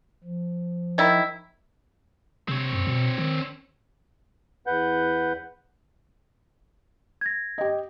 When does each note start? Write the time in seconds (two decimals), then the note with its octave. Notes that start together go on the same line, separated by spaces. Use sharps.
0.24 F3
0.98 D#3 E4
2.48 C3 C4 C#5
2.73 F#2
2.87 B2
3.18 D#3
4.67 E2 B4 F#5 G6
7.21 G#6 A#6
7.58 G4 D#5